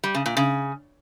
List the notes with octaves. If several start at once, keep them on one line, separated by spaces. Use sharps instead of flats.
G3
C#3
A#2
C#3